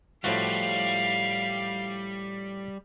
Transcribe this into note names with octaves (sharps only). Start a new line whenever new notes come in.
A2 F3 G3 F#4 F5